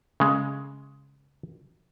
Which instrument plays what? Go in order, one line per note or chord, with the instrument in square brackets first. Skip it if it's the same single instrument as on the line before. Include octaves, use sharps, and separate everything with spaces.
[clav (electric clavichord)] C#3 G#3